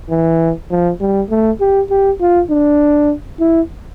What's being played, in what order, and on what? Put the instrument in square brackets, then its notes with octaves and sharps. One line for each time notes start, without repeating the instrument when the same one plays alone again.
[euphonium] E3
F3
G3
A3
G4
G4
F4
D4
E4